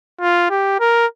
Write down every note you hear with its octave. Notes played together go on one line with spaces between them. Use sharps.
F4
G4
A#4